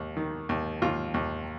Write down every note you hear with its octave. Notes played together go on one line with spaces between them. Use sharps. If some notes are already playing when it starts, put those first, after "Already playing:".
Already playing: D#2
D#3
D#2
D#2 F4
D#2